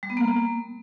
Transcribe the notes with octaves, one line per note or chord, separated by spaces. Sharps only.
G3
B3
A#3